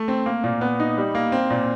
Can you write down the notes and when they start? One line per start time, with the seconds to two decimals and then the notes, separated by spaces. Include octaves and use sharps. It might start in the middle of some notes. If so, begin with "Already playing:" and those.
Already playing: A3
0.08 C4
0.26 A#3
0.44 A#2
0.61 B3
0.80 D#4
0.98 G3
1.15 A#3
1.32 C4
1.50 A#2